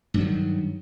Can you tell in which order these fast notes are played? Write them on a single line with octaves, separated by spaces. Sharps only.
G2 F#3 D#3